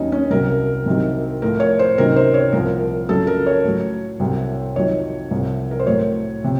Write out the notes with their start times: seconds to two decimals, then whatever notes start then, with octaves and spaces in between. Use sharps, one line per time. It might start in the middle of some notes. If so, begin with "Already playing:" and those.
Already playing: D#2 D#3 F#3 C#4 D#4
0.12 C#4
0.30 C2 C3 F#3 A#4
0.86 C2 C3 D#3 F#3
1.42 A2 F3 A#4
1.60 C#5
1.79 C5
1.98 C#2 C3 D#3 F#3 A#4
2.16 C5
2.34 C#5
2.53 C2 A#2 F3 A#4
3.09 F2 C#3 F#3 A4
3.27 A#4
3.46 C#5
3.65 A2 F#3
4.20 C2 C3 F#3
4.75 F2 D#3 F#3 C#5
5.31 C2 C3 F3
5.71 A#4
5.80 C5
5.87 A2 F#3 C#5
6.42 C3 F3